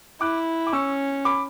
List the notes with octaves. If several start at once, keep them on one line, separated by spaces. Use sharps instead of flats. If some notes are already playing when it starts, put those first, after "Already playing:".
E4 D6 F#6
D6
C#4 C#6 E6
B5 D6